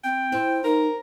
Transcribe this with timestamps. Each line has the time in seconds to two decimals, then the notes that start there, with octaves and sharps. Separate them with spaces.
0.04 C4 G5
0.32 C4 E4
0.64 D#4 A#4